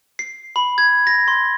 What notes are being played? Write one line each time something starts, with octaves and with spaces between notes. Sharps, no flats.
C7
B5
G#6
A#6
C6